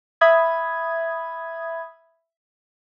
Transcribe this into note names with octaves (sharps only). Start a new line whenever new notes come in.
E5 B5 D#6 G#6